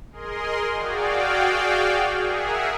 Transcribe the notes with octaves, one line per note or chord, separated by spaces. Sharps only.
G#4 A#4 D#5 C6
F#4 G#4 D5 F5 G5
G#4 A#4 E5 F#5